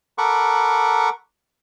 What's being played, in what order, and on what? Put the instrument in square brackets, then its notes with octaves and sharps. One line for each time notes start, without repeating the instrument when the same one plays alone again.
[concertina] A4 A#4 F#5 B5 C#6 D6